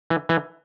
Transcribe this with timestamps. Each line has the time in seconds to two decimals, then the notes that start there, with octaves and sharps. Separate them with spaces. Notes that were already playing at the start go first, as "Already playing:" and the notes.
0.10 E3
0.29 E3